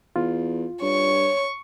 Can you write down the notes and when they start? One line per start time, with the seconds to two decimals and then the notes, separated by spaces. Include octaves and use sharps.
0.16 E2 F4
0.82 G2 C#5 C#6